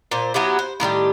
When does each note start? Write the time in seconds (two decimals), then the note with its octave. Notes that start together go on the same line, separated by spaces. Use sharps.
0.11 A#2 C5
0.34 F#3 B3 E4 G4
0.59 C5
0.80 A2 D#3 G3 G4